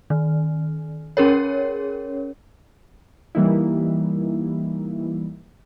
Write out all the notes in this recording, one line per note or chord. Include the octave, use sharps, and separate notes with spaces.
D#3
C#4 G#4 A#4 C#5
E3 G3 A#3 D#4 E4